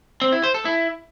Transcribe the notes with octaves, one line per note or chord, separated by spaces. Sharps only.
C4
E4
C5
A4
E4